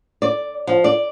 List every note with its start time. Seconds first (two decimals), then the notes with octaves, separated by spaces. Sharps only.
0.22 D5
0.67 F3
0.84 D5